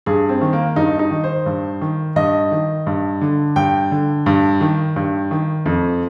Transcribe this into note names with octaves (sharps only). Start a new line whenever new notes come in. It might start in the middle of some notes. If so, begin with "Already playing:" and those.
G2 G#4
C4
D#3
A#3
G2 D#4
D#4
D#3
C5
G2
D#3
G2 D#5
D#3
G2
D3
G2 G5
D3
G2
D#3
G2
D#3
F2